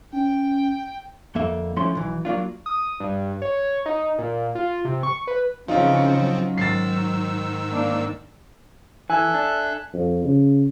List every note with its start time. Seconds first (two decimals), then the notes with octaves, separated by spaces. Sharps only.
0.13 C#4 G5
1.35 F2 D3 A#3 A4 E5
1.76 F3 A3 C#4 D4 E4 C6
1.95 B1 E3
2.25 F#3 A#3 D4 F4
2.66 D#6
3.00 G2
3.42 C#5
3.86 D#4
4.19 A#2
4.55 F4
4.85 C3
5.03 C#6
5.27 B4
5.68 C#3 E3 F3 C4 C#4 D#4 F4
6.16 F#3
6.58 G#2 D#3 E6 A6 C7
7.72 A#3 D4
9.10 E3 A4 E5 G#5 F#6
9.34 D4
9.93 F2
10.24 C#3